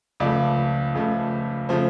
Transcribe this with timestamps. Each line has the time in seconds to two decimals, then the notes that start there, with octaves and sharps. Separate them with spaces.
0.20 C#2 C#3 F3 A3 D5
0.94 C#2 C#3 F3 A3
1.69 C#3 F3 A3 C5